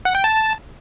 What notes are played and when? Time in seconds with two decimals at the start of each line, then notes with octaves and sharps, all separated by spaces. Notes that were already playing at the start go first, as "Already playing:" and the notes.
0.05 F#5
0.15 G5
0.24 A5